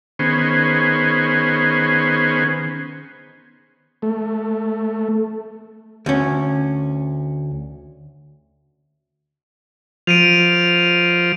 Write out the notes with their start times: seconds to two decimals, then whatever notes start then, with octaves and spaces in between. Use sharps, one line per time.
0.19 D#3 B3 C#4 G#4 C5
4.02 A3
6.06 D2 C#4
10.07 F3 D7 D#7 F7